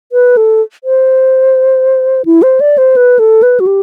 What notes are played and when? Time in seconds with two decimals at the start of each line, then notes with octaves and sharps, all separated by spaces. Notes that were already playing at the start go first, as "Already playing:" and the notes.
0.12 B4
0.37 A4
0.84 C5
2.25 E4
2.42 C5
2.61 D5
2.78 C5
2.96 B4
3.19 A4
3.43 B4
3.60 F#4
3.67 G4